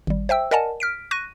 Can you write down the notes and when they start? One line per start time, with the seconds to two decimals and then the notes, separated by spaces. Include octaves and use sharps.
0.07 G#1 G3
0.29 C5 E5 G5 E6
0.51 A#4 D5 D#5 F#5 G#5 A5
0.80 F6 B6 D7
1.11 C#6 F#6 A#6 D#7